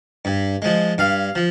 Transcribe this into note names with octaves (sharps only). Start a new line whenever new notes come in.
G2
F3 G#3
G2 F5
F3